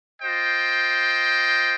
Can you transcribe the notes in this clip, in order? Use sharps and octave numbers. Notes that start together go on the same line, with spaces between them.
F4 C5 D#5 G5